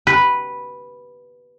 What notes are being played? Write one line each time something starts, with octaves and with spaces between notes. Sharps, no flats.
B4